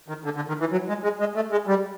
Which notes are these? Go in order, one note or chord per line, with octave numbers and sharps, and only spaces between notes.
D#3
D3
D3
D#3
E3
F#3
G#3
G#3
G#3
A3
G#3
G3